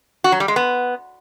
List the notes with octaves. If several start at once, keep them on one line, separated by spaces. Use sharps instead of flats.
F#4
F#3
G3
G#3
B3